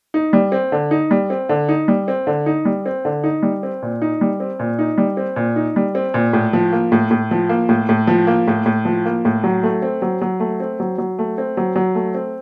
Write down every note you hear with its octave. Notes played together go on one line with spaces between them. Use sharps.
D#4
G3
C4
D3
D#4
G3
C4
D3
D#4
G3
C4
D3
D#4
G3
C4
D3
D#4
G3
C4
A#2
D#4
G3
C4
A#2
D#4
G3
C4
A#2
D#4
G3
C4
A#2
A2
F3
A#3
A2
A2
F3
A#3
A2
A2
F3
A#3
A2
A2
F3
A#3
A2
F#3
A3
C4
F#3
F#3
A3
C4
F#3
F#3
A3
C4
F#3
F#3
A3
C4